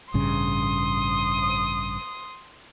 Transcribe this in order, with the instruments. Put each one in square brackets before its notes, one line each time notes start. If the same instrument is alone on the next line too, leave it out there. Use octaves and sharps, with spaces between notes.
[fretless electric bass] A1 G2 C#3 [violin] C6 D#6